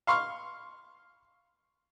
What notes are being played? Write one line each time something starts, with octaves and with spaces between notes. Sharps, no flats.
F5 C6 C#6 F6